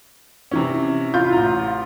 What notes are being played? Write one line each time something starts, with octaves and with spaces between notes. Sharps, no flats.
C3 E3 C#4
E4 F4 G6
A1 A#5